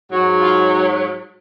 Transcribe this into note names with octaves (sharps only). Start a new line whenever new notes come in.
G#2 F#3 F#4
F4